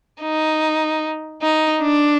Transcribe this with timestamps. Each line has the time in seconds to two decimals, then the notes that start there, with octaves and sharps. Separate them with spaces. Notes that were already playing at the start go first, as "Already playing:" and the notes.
0.22 D#4
1.42 D#4
1.82 D4